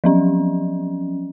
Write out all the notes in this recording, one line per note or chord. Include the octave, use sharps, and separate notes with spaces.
F3 F#3 C#4